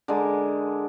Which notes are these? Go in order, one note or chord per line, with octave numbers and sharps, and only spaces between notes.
D3 G#3 A#4